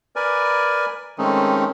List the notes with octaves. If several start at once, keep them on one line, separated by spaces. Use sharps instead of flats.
A#4 B4 D5 G#5
D#3 G#3 A3 C4 C#4 D#4